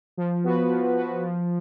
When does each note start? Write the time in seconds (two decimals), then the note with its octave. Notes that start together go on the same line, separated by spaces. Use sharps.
0.17 F3
0.44 B3 F#4 B4
0.70 F3
0.96 B3 F#4 B4
1.23 F3